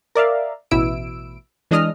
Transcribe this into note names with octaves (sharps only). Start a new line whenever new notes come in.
A#4 D5 E5 F5
A1 B2 E4 E6 D7
E3 G#3 D4 D#5 D#6 F6